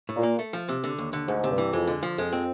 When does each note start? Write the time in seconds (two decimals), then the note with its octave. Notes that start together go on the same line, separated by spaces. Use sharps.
0.09 A2
0.16 A#2
0.23 A#3
0.39 A3
0.53 F3
0.69 C3
0.84 D3
0.98 D#2
1.13 D3
1.28 D2 G#2
1.44 C3
1.50 G2
1.58 E3
1.73 F2 G#3
1.88 D3
2.03 F3
2.18 F2 G#3
2.33 C4